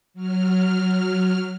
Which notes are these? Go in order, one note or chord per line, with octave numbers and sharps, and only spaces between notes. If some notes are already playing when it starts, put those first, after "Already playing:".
F#3 F6